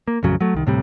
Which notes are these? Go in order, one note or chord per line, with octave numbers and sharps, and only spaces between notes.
A#3
A1 F2 C#3 F#3
F#3 A3
C2 D#3
D2 A2 C3 G3